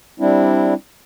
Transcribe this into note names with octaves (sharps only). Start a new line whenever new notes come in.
G3 C4 D4 E4